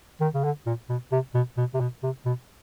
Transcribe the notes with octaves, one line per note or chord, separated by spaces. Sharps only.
D#3
C#3
D3
A#2
B2
C3
B2
B2
C3
B2
C3
B2